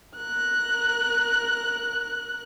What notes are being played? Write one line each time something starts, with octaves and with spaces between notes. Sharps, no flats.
A#4 F#6